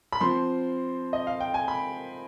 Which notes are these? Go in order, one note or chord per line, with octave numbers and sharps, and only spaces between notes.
B5
F3 C4 C6
D#5
F5
G5
G#5
B5